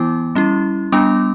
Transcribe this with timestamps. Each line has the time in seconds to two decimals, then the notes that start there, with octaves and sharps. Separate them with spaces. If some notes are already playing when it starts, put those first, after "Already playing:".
Already playing: E3 B3 E4 D6
0.35 G3 C#4 E4
0.92 G3 B3 D4 D6